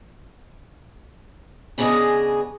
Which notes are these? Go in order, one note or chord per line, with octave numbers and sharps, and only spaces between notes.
C#3 B3 D4 G#4 D#5